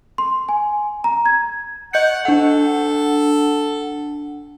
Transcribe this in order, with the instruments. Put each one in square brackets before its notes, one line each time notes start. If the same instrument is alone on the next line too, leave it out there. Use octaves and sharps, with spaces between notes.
[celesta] C6
G#5
A#5
G#6
[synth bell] D#5 G6 C#7 [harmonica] F#5
[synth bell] D4 F#5 [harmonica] A4